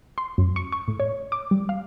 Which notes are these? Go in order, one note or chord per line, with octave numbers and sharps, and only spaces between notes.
C6
F#2
C#6
C#6
A2
C#5
D6
G3
F5